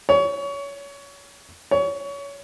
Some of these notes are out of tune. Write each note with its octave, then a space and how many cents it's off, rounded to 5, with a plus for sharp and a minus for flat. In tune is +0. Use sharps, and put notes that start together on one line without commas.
C#5 +25
C#5 +25